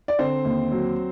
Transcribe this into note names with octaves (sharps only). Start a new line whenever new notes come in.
D5
D3 C4 C5
D#2
F#3